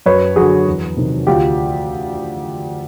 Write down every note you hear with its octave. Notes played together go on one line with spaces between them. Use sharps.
F#2 B4 C#5
D3 F#3 F#4 G#4
E2
C3 D#3
D2 F4 G4